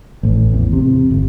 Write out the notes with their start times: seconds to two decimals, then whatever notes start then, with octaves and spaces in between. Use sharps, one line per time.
0.23 A1
0.53 E2
0.73 C3
1.10 G1